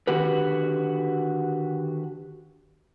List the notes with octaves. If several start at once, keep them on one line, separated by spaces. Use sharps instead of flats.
D3 D#3 F#4 G4 B4